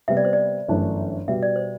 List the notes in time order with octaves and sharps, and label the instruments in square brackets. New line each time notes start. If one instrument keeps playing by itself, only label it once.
[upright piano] C3 G3 B3 [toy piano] E5
[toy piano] D5
C5
D5
[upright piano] G1 F#2 E3 A3 D4
[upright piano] B2 G3 B3 F#4 [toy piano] E5
[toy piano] D5
C5